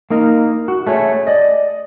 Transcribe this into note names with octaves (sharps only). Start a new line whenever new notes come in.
A#3 D#4 A#4
F#4
A3 G#4 C#5
D5 D#5